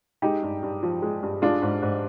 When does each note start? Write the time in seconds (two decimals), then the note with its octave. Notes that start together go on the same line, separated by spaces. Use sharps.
0.22 G#3 D#4 G4
0.43 G2
0.63 G2
0.83 F3
1.02 G#3
1.22 G2
1.42 G#3 D4 F4
1.62 G#2
1.82 G#2